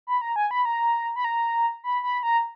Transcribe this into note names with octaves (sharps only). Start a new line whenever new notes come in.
B5
A#5
G#5
B5
A#5
B5
A#5
B5
B5
A#5